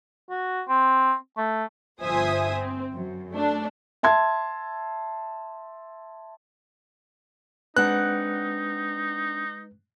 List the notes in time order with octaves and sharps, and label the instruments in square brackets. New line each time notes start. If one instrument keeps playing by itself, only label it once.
[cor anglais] F#4
C4
A3
[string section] G1 F3 C5 E5 G#5 D#6
C4
F#2
A3 D4
[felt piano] E5 A5 C6 G#6
[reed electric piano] G#3 B4 [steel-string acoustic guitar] C4 D4 F#5 [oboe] D#4 [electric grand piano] F#6